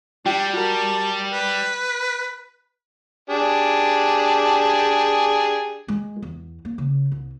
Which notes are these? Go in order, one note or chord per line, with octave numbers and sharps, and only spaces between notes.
G3 D4 G4
F#4 A#4 A5
B4
D4 G4 G#4
G#3
E2
A#3
C#3
C2